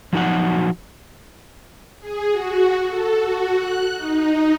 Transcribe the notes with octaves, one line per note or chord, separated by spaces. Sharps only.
F3 F#3 D#4 F#4 F#5
G#4
F#4
A4
F#4
F#6
D#4